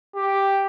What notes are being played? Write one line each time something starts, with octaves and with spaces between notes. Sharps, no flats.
G4